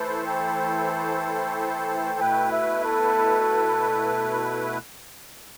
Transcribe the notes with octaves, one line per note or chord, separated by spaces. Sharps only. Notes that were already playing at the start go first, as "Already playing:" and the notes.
Already playing: E3 A3 E4 A4 B4 C5
G5
G5
G5
B2 A3 E4 B4 G5
E5
A4